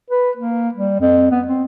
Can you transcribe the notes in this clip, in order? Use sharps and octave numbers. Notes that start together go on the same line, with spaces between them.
B4
A#3
G3
F2
B3
C4